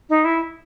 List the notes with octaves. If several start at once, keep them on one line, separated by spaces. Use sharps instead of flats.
D#4
E4